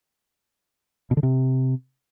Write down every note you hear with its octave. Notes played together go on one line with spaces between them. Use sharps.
B2
D3
C3